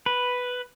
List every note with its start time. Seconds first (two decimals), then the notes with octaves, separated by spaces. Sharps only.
0.06 B4